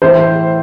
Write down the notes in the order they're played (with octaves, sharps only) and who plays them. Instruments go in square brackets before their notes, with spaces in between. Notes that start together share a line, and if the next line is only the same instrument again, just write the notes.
[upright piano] A2 E3 C5